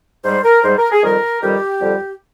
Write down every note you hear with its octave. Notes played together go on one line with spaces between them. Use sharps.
G#2 G3 C5
A#4
G#2 G3 C5
A#4
G#4
F2 D#3 G3 A#4
F2 D#3 G3 G4
F2 D3 G3